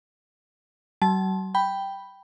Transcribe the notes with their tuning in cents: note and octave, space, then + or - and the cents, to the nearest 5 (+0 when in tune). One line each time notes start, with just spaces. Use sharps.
F#3 +45 A5 -20
G5 +0 B5 +0